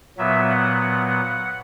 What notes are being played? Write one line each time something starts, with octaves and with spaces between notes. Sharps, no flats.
A#2 F#3 B3 E5
F#5
F#5